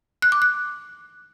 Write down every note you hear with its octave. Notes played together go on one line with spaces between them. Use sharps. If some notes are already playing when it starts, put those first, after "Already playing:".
F#6
D6
F#6